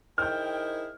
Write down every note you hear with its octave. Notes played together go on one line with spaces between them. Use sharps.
D#3 E4 G#4 C5 G5 F6 G6